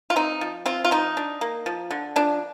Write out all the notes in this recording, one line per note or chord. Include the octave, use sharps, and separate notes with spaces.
F4
C4 D#4
F3
C4 F4
F4
F3 D#4
D4
A#3
F3
D3
F3 D4